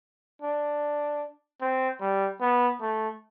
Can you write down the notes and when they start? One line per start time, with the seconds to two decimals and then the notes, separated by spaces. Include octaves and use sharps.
0.42 D4
1.61 C4
2.01 G3
2.41 B3
2.81 A3